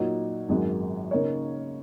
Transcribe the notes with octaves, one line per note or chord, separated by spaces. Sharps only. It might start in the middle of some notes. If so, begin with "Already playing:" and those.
Already playing: A#2 F#3 D#4 F#4
G#1 F#2 D#3 G#3 F#4
C#3 A#3 D#4 A#4 C#5